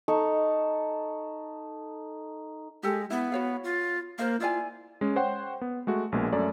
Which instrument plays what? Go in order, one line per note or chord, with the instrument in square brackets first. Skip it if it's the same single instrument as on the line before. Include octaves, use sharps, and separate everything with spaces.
[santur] D#4 A4 A5 C#6
[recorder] G#3 [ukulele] G4 A4
[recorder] B3 [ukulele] E4
[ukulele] F#4 C#5 F5
[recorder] F4
[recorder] A#3 [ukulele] A#4 C5 F5
[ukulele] E4 D5 G#5 [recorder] F4
[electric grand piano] G#3 C#4
C5 C#5 F#5 G5 C6
B3
G#3 A3 F#4
A#1 B2 G#3 A#3
F#2 A3 A4 D5